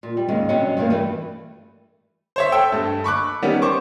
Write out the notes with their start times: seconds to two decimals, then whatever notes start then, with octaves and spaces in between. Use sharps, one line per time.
0.03 A#2
0.17 G3
0.29 D#2 G#2 C#3 G#3
0.49 C3 F#3 G3 C#4 D4
0.77 G2 B2 A3 A#3
0.90 E3 G3 A3
2.36 C5 C#5 E5
2.52 A4 G5 E6
2.72 G2 A3
3.04 B5 C#6 D6 F#6
3.42 D#3 G3 B3 C#4
3.62 C5 C#6 D6